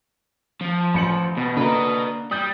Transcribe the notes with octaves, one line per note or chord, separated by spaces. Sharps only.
F3
A1 C#7 F#7
B2
D3 A#3 B4 D#5 A#5
G3 D#6 G6